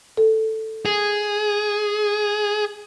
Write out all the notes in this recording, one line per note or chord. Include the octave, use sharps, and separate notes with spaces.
A4
G#4